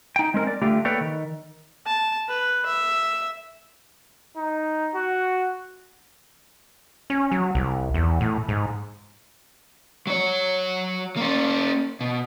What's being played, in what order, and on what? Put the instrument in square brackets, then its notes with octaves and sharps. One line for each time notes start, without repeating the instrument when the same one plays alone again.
[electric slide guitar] D#4 G5
G#3 C4 A#4
D5
D3 A3 F4 G4 G5
A#3 A4 B4 C#5 D5 G5
D#3
[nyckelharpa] A5
B4
E5
[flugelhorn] D#4
F#4
[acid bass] C#4
F#3
C2
E2
A2
G#2
[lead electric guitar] F#3 C#5
A#3 C#4
B2